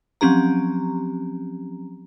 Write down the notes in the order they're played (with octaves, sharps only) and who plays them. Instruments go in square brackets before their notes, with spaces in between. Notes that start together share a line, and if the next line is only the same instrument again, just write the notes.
[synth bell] F3 F#3 C4 C#4 G4 A#5